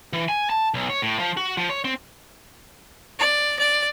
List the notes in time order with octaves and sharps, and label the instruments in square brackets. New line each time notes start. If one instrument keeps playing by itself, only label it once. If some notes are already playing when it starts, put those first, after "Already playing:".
[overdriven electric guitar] E3
G#5
A5
B1
C#5
A2
F3
F#4
F3
C#5
C4
[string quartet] D5
D5